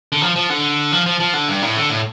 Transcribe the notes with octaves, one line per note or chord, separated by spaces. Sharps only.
D3
F3
F3
D3
F3
F3
F3
D3
G2
A2
D3
A2